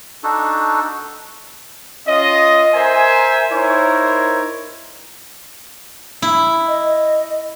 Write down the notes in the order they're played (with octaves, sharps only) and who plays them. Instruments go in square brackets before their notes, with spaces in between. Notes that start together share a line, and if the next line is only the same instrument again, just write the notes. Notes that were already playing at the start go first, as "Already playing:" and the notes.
[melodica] D4 D#4 F#4 A4
[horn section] C#4 F4 D#5
A#4 C5 E5 G#5
D#4 E4 A#4 C5 C#5
[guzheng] E4
[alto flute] D#5